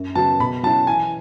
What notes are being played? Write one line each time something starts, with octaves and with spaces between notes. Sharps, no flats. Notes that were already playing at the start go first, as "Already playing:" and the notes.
Already playing: F#2
C#3 F#3 B3 F#4 A5
B2 B5
F#3 C#4 E4 A5
E3 G#5